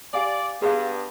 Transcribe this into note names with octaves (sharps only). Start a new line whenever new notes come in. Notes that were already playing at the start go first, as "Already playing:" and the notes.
G4 D5 F5 G#5
G2 B3 G#4 F5